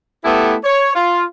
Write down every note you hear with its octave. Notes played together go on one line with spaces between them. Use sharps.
A3 B3 E4 G4 A4
C#5
F4